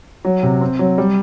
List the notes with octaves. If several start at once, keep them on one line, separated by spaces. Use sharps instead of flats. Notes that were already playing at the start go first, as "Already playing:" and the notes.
F#3
C3
C4
F#3
G3